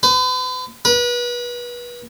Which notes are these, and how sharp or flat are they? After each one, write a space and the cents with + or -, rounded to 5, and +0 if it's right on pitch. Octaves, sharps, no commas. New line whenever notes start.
B4 +45
B4 -30